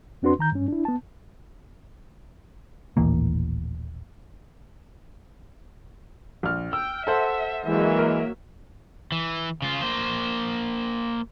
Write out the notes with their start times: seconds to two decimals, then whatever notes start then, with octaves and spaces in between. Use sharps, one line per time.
0.22 F2 C4 D4 F#4 B4 C6
0.39 D#3 A#5 G6
0.52 G2 C#4
0.68 D4 E4
0.85 B3 A5
2.97 D#1 A1 E3 A#3
6.43 A#1 F6
6.73 G5 E6
7.07 A4 C5 E5 F#5
7.66 E3 F#3 G#3 A#3 E5
7.98 A#4
9.12 E3
9.62 C#3 F4
9.82 A#3 C5